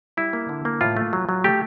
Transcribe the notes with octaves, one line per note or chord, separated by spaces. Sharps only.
G3 E4
A#3
D3
A#3
A2 F4
A3
F#3
F#3
A3 G4